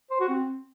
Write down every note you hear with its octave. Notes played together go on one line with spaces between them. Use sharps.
C5
F#4
C4